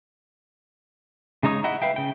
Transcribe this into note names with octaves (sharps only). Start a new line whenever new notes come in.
C#3 G#3 D#4 C#5 D#6
E4 D#5 E5 F#5
B4 E5 F5 G5
C#3 G5